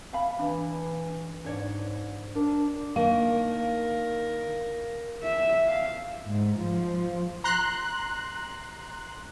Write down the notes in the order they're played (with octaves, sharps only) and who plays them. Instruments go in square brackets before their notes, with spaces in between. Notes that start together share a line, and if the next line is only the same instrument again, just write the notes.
[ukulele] E5 F5 B5
[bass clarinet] E3 [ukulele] D4
[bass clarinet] G#2 [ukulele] D4 C#5 D5
[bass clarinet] D4 [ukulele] A#4
[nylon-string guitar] D#3 A#3 D4 [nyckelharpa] A#4 [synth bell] F5
[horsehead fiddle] E5
F5
[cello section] G#2
F3
[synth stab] A#5 C6 F#6